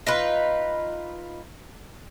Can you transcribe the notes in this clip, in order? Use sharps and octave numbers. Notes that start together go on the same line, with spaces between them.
D#4 F4 B4